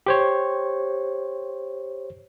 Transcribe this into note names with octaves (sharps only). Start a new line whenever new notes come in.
G4 C5 C#5